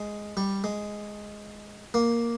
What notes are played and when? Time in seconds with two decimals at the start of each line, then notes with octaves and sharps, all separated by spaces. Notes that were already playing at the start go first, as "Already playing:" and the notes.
Already playing: G#3
0.37 G3
0.64 G#3
1.94 A#3